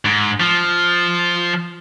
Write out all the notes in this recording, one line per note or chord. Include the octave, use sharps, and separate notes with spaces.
G#2
F3